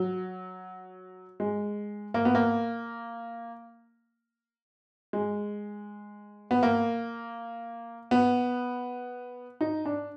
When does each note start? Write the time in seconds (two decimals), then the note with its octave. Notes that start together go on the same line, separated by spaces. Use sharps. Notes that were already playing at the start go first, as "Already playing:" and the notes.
Already playing: F#3
1.40 G#3
2.14 A#3
2.25 B3
2.35 A#3
5.13 G#3
6.51 B3
6.63 A#3
8.11 B3
9.61 D#4
9.86 D4